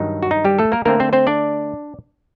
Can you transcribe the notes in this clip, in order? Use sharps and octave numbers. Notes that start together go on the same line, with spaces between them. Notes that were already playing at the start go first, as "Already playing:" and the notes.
Already playing: G2 D#3 F#3 D#4
F#4
D#4
G3 G4
A3 A4
A#3 A#4
D3 A3 A#3 C4 A#4
C4 C5
C4 C5
D4 D5